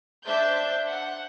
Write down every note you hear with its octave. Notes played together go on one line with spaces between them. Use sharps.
D4 C5 E5 A5 G6
F#5